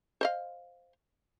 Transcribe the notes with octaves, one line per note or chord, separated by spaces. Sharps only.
C5 D#5 F5